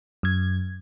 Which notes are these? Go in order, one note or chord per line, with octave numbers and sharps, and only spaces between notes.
F#2 G#6